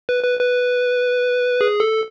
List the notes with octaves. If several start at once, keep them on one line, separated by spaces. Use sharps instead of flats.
B4
B4
B4
G#4
A4